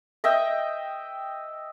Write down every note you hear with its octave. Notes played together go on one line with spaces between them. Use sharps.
D#5 E5 G5